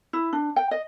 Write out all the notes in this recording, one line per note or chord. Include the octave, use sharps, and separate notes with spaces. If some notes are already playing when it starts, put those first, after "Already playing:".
E4
D4
G5
D#5